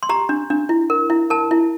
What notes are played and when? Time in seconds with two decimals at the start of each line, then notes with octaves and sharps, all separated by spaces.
0.03 C6
0.09 G4 A#5
0.29 D4
0.50 D4
0.69 E4
0.90 A#4
1.10 E4
1.30 A#4 A5
1.51 E4